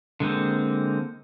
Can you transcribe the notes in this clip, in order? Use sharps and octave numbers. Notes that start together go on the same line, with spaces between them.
D3 G#3 A#3 C4